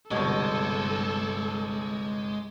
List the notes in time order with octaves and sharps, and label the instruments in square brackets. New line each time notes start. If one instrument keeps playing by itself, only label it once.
[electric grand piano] G1 C2 [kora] G2 B2 C#5 [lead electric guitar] G#3 [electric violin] A4